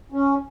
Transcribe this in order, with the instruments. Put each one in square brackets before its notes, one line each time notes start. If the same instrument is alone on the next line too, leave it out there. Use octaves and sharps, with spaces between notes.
[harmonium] C#4